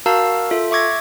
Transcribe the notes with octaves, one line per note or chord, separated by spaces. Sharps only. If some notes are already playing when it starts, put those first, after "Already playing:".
F#4 A#4 F5 A5 A#5 E6
F4 A4 E5
E5 C#6 D6 G#6 A#6